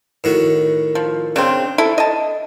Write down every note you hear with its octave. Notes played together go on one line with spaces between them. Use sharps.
A2 D#3 F#4
F3
C#3 C4 D4
E4 A4
D#5 A5